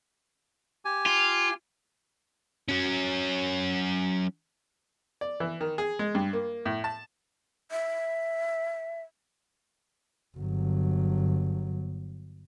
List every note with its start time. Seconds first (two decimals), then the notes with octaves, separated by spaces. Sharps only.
0.85 G4 G#5
1.06 F4
2.68 F#3 C#4
5.21 D5
5.40 E3
5.61 D#3
5.78 G#4
5.99 G#3
6.15 G2
6.33 A#3
6.66 A2
6.84 A5
7.71 E5
10.37 G1 F#3